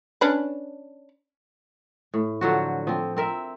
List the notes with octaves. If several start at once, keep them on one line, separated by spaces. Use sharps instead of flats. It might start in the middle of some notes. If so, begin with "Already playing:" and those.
C#4 D4 B4
A2
D3 F3 F#3 F#4
F3 C4
C4 A#4 E5